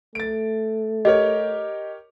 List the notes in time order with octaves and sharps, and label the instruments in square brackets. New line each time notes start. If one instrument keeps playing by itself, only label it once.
[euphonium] A3 [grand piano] A6 D7
[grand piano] G4 A#4 C#5 [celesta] D#5